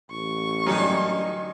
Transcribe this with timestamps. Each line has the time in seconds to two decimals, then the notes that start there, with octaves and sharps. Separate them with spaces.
0.10 A1 C#6
0.66 F#2 D3 F#3 G3 D#4